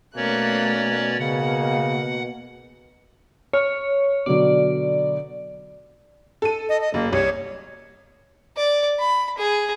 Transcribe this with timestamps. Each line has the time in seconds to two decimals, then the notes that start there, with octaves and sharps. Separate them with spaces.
0.16 B2 A3 A#3 C#4 C#5 D5 F#6
1.20 C#3 A#3 F#5
3.53 C#5 F6
4.26 B2 D3 F#3 D5
6.42 A4 D#7
6.69 D#5
6.81 D#5
6.94 F#1 A#3
7.13 C2 C#5
8.57 D5
8.99 B5
9.38 G#4